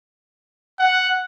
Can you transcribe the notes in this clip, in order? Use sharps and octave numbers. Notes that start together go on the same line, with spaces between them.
F#5